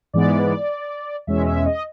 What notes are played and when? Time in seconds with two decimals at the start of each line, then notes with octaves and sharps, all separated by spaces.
0.13 G#2 E3 G#3 B3 D5
1.27 E2 B2 G#3 C#4 E5
1.46 E5
1.66 D#5